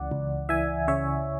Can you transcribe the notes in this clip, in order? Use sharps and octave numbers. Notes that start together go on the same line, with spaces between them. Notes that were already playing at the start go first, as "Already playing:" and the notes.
Already playing: C#2 C#3 E3 D5 F#5
C#2
E3 E5 G#5
C#3 C#5 E5